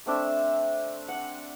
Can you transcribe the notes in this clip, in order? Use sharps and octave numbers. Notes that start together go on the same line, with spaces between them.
A3 C4 D4 E5
F#5